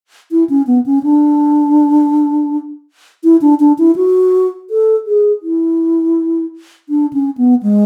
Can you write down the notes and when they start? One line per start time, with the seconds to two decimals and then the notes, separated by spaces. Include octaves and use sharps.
0.31 E4
0.49 C#4
0.67 B3
0.86 C#4
1.03 D4
3.24 E4
3.41 D4
3.60 D4
3.78 E4
3.96 F#4
4.70 A4
5.06 G#4
5.42 E4
6.89 D4
7.13 C#4
7.37 B3
7.63 G#3